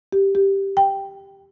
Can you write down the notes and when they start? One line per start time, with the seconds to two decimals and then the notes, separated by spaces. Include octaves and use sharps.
0.13 G4
0.35 G4
0.77 G5